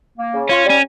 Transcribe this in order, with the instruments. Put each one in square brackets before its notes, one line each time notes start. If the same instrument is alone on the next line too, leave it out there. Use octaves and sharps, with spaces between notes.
[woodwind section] A#3
C#3
[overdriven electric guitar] C#4 [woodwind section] F4
[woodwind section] G3 [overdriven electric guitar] C#4